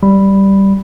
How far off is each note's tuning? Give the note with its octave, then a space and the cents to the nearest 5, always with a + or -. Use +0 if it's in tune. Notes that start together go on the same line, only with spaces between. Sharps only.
G3 -5 B5 +0